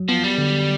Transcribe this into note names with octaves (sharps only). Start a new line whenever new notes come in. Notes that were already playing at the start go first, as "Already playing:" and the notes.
Already playing: F#3
F3 B3
G3
D3